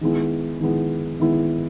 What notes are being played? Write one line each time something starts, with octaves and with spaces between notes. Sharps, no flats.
D#3 G#3 B3 E4
D#3 G#3 B3 E4
D#3 G#3 B3 E4